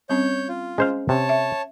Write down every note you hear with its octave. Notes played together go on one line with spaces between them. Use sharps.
G3 C4 C#4 C#5 G6
F4
G#3 C#4 C5 F5
C3 C#5 A5
E5